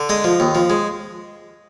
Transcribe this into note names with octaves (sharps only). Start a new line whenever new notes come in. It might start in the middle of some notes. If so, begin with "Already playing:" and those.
Already playing: D3
G#3 D#5
F3
D#2
F3
G#3